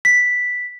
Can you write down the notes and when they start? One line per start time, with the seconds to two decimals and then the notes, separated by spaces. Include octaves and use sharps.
0.05 B6